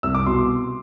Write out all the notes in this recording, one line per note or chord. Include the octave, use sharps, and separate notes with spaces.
C2 E6
D6
B2 C6